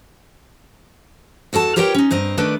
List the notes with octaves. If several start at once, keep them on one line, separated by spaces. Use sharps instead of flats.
E2 F#4 A4 A5
F4 G4 A#4 B4 C#5 G5
C#4 D#4
G2 C4 D#5 A#5
D#3 A3 D4 B4 D5